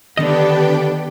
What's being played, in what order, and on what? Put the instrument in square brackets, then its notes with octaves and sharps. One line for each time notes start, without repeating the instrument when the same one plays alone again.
[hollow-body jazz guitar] D3 D#3 D#5 [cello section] B3 D4 [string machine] G4 B4 G5